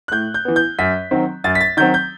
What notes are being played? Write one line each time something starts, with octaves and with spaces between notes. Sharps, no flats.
F#6
A2 G6
G6
E3 B3
G6
F#2 B6
D#3 F#3 C4
F#2 A6
B6
A6
D#3 F#3 C4 G6
G6